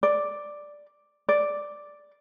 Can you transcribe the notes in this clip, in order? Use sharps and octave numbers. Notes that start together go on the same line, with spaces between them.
D5
D5